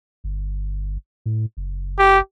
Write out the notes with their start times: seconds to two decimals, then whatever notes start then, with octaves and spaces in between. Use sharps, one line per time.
0.24 G1
1.26 A2
1.57 F#1
1.99 G4